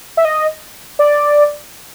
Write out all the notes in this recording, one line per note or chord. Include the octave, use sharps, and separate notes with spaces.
E5
D#5
D5